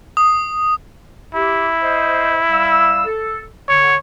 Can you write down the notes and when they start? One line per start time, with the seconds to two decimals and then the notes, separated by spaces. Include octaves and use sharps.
0.17 D#6
1.35 E4 G4
1.81 C5 D#5
2.50 G3 F5 E6
3.05 A4
3.68 D3 C#5